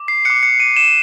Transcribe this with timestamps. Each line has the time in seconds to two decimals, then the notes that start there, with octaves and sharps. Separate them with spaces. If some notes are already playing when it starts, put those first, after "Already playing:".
Already playing: D6
0.08 C7
0.25 D6 F#6 C#7
0.43 C#7
0.60 D#7
0.76 E7